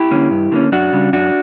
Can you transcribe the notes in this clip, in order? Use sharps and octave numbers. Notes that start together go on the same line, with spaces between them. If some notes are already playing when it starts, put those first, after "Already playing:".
Already playing: E4 G4
D3 A#3 C#4
G2
D3 A#3 C#4
F#2 D4 F#4
C#3 G3
F#2 D4 F#4